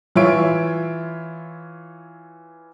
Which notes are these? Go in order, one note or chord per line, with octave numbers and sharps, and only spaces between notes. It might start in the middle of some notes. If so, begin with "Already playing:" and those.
E3 F4 C#5 E5 D7